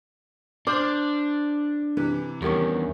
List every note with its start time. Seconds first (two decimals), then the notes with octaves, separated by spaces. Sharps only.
0.67 D4 C5 D6 F6 G6
1.97 C3 E3 B4
2.42 E2 G2 D#3 C#4